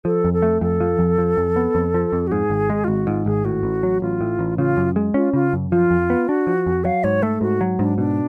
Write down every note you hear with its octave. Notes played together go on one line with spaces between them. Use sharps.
F3 A4
F2
A4
A3
F2 A4
F3
F2
F3
F2
B3
F2
F3
F2
F#4
G#2 G#4
G#1
G#3
F4
G#1 F#4
G#2 F4
G#1 G#4
A2 F#4
A1
F#3
A1 F4
A2
A1
C#3 F4
F#2
G#3
C#4 F4
C#3 F4
F#2
F3 F4
F2
B3
D4 F#4
F3
F2
F#3 F5
G#2 C#5
A3 A4
G#2 F#4
F#3
G#2 D4
B2 D4